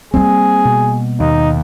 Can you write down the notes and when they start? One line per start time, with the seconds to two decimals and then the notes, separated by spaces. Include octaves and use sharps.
0.14 G3 A#3 C4 G#4
0.65 B2
1.20 D#2 D#4